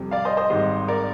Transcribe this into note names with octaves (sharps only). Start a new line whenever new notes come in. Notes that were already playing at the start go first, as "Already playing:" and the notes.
Already playing: F2 C3 G3
D5 F5
C5 D#5
C5 D#5
G#1 G#2 D#3 G3
A#4 D5